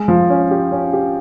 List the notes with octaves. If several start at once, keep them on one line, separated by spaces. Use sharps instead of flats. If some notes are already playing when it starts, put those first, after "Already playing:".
Already playing: G#3
F3
C#4
G4
C#4
G4